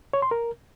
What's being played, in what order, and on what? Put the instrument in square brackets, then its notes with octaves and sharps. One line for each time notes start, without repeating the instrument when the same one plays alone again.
[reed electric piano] C#5
C6
A#4